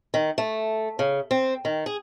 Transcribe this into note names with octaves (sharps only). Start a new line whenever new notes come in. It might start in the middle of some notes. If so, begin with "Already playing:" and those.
D#3
A3
C#3
C4
D#3
G#4